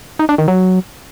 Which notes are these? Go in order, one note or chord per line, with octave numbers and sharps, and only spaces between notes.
D#4
D4
D#3
F#3